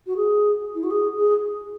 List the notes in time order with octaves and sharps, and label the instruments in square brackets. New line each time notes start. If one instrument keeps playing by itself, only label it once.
[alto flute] F#4
G#4
E4
F#4
G#4
G#4